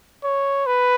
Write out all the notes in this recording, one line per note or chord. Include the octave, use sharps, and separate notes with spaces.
C#5
B4